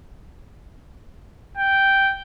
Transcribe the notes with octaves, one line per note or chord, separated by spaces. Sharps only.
G5